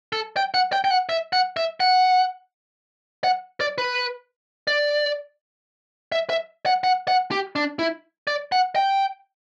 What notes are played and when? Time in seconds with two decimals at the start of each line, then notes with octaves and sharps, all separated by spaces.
0.13 A4
0.37 G5
0.54 F#5
0.73 G5
0.84 G5
0.91 F#5
1.09 E5
1.33 F#5
1.57 E5
1.80 F#5
3.24 F#5
3.60 D5
3.78 B4
4.67 D5
6.12 E5
6.30 E5
6.66 F#5
6.84 F#5
7.08 F#5
7.31 G4
7.56 D4
7.79 E4
8.27 D5
8.52 F#5
8.76 G5